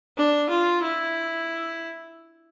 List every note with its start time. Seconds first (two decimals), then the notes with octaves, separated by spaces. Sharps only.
0.17 D4
0.50 F4
0.83 E4